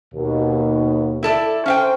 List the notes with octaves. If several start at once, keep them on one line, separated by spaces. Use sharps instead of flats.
D#2 B2
E4 A4 D5
C#4 C5 F5 G5